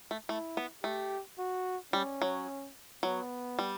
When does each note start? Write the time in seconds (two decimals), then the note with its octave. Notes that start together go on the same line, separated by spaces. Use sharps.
0.11 A3
0.29 A3 E4
0.57 B3
0.83 A3 G4
1.39 F#4
1.93 G3 C#4
2.22 F#3
3.03 F#3 B3
3.59 G3